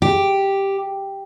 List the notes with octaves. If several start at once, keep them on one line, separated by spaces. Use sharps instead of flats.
G4